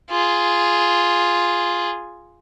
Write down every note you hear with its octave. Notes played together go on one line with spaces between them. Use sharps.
F4 G#4